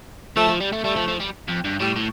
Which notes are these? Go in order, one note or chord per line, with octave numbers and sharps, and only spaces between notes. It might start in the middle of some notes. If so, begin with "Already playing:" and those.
F3 A3
F3
G3
A3
G3 A3
F3
F3
G3
F2
G2
A2 G3
A2